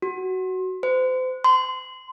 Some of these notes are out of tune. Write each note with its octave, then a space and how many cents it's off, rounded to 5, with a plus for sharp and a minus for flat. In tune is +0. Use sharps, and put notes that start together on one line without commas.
F#4 +15
C5 -35
C6 -25